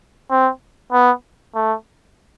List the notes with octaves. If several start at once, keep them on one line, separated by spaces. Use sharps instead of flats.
C4
B3
A3